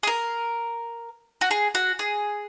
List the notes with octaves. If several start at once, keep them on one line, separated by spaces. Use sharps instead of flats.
G#4
A#4
F#4
G#4
F#4
G#4